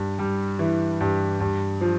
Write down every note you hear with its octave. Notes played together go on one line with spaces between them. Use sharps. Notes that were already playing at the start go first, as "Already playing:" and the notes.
Already playing: G2
G3
E3
G2
G2
F3